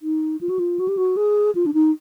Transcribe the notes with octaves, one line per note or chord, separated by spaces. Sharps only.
D#4
F4
F#4
F4
F#4
G4
F#4
G#4
F4
D4
D#4